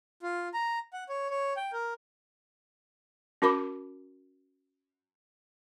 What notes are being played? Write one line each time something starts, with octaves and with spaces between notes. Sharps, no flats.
F4
A#5
F#5
C#5
C#5
G5
A#4
C#4 F#4 A#4 B5 D6